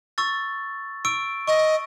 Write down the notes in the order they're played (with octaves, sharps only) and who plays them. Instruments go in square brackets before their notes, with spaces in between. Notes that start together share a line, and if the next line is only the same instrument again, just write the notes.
[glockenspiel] C#6 E6 A6
C#6 E6 D7
[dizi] D#5 [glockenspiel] C#6